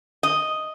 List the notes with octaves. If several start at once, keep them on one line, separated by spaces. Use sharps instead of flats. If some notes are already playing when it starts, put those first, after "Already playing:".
D#5